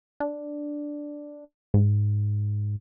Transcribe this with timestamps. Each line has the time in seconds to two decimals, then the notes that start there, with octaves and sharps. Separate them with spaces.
0.20 D4
1.74 G#2